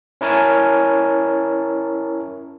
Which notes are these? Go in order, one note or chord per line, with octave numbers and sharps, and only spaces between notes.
C#4 E4 A#4 C#5 G#5 A5